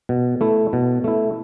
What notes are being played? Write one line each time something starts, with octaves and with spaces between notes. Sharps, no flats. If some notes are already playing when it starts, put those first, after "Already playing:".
B2
A3 E4
B2
A3 E4